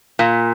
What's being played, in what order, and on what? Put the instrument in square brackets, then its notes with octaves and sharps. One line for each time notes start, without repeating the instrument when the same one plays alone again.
[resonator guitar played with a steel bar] A#2